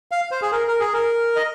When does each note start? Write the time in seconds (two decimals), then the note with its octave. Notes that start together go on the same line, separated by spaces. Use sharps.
0.12 F5
0.31 C5
0.42 G#4
0.52 A#4
0.67 A#4
0.80 G#4
0.93 A#4
1.36 D#5